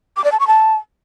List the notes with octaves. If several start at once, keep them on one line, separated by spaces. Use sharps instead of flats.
D6
D5
A5
C#6
A5